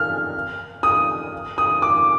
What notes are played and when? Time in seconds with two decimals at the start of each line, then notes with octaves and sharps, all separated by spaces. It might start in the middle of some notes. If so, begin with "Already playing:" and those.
Already playing: F6
0.83 D#6
1.58 D#6
1.82 D6